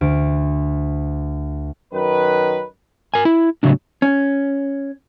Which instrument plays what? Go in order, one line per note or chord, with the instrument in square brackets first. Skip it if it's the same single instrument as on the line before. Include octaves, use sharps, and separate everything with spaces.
[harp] D2 D7
[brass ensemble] F#2 D#3 B4
[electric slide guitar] A#4 G#5
E4
A2 C#3 F#3 D4
[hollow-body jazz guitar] C#4